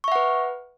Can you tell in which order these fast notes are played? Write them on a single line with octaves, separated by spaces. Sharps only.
C#6 E5 F#5 B4